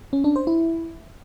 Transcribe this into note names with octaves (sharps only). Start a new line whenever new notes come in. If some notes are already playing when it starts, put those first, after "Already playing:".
C#4
D4
C5
E4